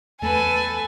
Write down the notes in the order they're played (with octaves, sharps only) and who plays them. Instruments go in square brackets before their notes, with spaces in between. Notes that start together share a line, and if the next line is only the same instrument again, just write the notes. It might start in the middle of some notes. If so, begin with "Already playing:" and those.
[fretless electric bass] E2 A3 [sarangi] A4 [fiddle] B4 [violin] G#5